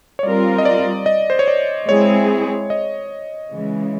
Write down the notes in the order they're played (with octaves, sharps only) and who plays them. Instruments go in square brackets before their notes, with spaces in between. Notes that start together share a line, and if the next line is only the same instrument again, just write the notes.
[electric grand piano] C#5
[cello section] G3 C4 F4 A#4 [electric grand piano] D5
[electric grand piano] D#5
D5
D#5
C5
C#5
D5
[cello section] G#3 C4 E4 G#4 [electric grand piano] C#5
[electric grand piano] D#5
[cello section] C#3 E3 G#3